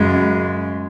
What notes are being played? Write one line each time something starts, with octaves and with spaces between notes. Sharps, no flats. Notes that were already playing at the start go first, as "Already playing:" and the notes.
Already playing: F#2 C#3 G#3